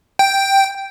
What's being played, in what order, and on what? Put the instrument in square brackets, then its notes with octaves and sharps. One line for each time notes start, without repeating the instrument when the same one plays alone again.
[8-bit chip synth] G5